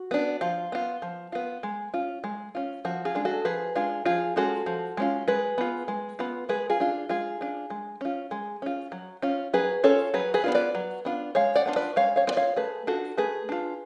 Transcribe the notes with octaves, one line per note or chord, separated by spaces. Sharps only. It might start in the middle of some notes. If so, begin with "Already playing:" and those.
Already playing: F#4
B3 D4
F3 F4
B3 F4
F3
B3 F4
G#3
C#4 F4
G#3
C#4 F4
F3 F#4
F4 G#4
G#3 D4
F#4 A4
F3 G#4 B4
G#3 D4 F4 G#4
F3 F4 G#4
G#3 C#4 F4 F#4 A4
F3
G#3 C#4 F4
G#3 G#4 B4
B3 F4
G#3
B3 F4
G#3 G#4 B4
F4 G#4
D4 F4
G#3 F4 G#4
D4 F4
G#3
C#4 F4
G#3
C#4 F4
F#3
C#4 F4
F#3 G#4 B4
C#4 F4 A4 C#5
F#3 G#4 B4
G#4 B4
B3 D4 F4
B4 D5
F#3
B3 D4 F4
G#3 C#5 F5
D5 F#5
B3 D4 F4
B4 D5
G#3 C#5 F5
C#5 F5
B3 D4 F4 D5
C#5 F5
A3 G#4 B4
D4 F4 F#4 A4
A3 G#4 B4
D4 F4